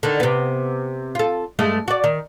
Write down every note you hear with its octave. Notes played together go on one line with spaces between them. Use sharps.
D3 D#3
C3 B3
F4 A4
G2 G#3 A3
F#4 D5
D#3